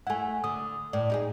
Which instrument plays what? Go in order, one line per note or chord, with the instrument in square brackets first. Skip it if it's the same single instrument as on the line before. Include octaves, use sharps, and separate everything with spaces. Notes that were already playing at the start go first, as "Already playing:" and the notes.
[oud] A3 E4 [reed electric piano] F#5 G#5
[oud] D3 [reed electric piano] D#6
[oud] A2 [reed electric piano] D5
[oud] D#4 G4 G#4